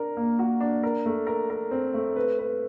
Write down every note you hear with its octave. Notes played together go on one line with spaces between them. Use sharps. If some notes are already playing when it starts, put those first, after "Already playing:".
Already playing: D4 A#4
A#3
F#4
D4
A#4
A3
A#4
A#4
C4
A3
B4
B4